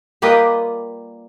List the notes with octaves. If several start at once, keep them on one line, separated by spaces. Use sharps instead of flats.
G3 A#3 F4 G4 B4 D#5